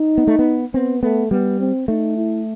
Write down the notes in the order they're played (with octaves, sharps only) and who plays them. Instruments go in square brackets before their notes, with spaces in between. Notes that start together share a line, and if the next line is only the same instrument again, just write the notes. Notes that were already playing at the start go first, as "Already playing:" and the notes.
Already playing: [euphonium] D#4
[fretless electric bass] B3
A3
B3
[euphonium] B3 [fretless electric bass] C4
[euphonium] A3 [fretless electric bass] B3
[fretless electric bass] G3 [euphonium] B3
[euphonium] C4
[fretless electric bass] A3 [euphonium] D#4
[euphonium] E4